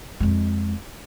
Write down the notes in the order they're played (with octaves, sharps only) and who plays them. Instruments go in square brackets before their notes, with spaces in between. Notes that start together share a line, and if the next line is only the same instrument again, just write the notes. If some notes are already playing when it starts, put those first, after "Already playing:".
[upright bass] F2 G#3